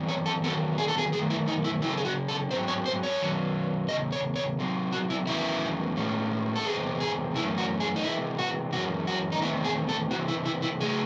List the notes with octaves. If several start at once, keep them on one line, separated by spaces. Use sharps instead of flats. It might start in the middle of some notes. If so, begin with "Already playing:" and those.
Already playing: F#2 E3 C4
C#5
A4
E2 D#3 F#3 A4
G#4
A4
G#4
F#2 D#3 A3 G#4
E4
D#4
E4
C#3 F#3 C#4 E4
A4
G#4
F#4
A4
G#2 F#3 C4 C5
C#5
C5
C#5
F#2 D#3 F#3 C#4
E2 C#3 D#5
C#5
C#5
C3 F#3 C4
F#4
E4
E2 D#3 F#3 A3 C#4 E4
A2 G#3 C#4
A4
E2 C3 G#3 C4 G#4
G#4
F#2 E3 A3 C#4 E4
F#4
G#4
D#4
C3 E3 G#3 E4
F#4
F#2 E3 G#3 C#4 F#4
F#4
D#4
E2 C3 D#3 A3 C4 E4
G#4
A4
C3 E3 C4 F#4
E4
E4
E4
C#3 F#3 A3 G#4